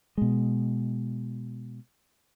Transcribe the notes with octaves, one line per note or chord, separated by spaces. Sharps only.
B2 G#3